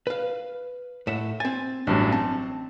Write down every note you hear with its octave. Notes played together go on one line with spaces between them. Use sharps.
B4 F5
A2 E5 F#5
C4 G#5 A6
A1 G2 F#3 D4
C4 A5